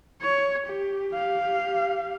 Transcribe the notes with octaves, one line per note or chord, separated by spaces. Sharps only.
C#5
G4
G4 F5